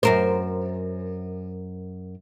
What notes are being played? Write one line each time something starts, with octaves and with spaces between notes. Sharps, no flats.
F#2 A#4 C5